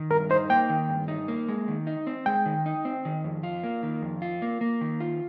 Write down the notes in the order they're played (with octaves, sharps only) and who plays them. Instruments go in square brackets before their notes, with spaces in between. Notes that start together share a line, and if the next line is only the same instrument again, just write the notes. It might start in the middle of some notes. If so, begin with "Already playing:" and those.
Already playing: [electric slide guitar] D#3
[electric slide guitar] G2 [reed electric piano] A#4
[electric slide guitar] D#4 [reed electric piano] C5
[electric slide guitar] A#3 [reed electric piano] G5
[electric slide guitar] D#3
G2
D#4
A#3
G#3
D#3
D#4
C4
[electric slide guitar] G#3 [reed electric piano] G5
[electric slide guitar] D#3
D#4
C4
D#3
F2
F4
A#3
D#3
F2
F4
A#3
A#3
D#3
F4